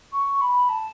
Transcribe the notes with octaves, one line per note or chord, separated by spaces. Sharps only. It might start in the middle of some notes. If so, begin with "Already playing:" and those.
C#6
B5
A5